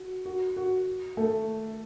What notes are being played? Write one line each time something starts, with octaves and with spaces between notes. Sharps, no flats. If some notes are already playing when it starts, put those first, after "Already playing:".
Already playing: F#4
F#4
F#4
A3